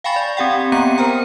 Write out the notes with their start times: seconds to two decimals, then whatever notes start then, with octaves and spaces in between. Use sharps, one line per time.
0.04 F5 G5 G#5 B5 C#6 A6
0.16 D5
0.37 C4 G4 F#5 G5
0.72 A#3 B3 G4 A#5 C#7
0.98 A#4 C5 G5 A#5